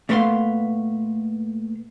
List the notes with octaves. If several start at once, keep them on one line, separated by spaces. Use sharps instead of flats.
A#2 A3 B3 A#4 F5 C6